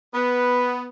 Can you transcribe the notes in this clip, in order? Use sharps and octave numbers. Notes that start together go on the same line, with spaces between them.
B3 B4